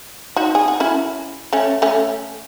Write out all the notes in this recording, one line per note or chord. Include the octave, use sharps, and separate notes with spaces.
D#4 F#4
G#4
F#4
C#4 E4
A3 C#4
A3 C#4